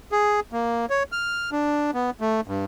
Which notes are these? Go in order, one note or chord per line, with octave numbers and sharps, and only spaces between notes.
G#4
A#3
C#5
F6
D4
B3
A3
G2